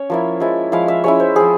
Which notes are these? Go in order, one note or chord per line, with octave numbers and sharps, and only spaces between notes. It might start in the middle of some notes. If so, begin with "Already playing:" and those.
Already playing: C#4 C#5
F3 A#3 E4
F3 G#3 E4
F3 G#3 E4 F5
E5
G#3 C#4 E4 C#5
C5
F3 G#3 C4 G#4